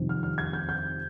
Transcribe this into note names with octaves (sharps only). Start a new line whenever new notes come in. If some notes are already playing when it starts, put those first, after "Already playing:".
Already playing: F2 C3 D#3 G3
F6
F6
G#6
G6
G6